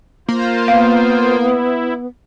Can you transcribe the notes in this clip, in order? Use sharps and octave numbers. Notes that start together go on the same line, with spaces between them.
A#3 F4 C5
B3 F5
E4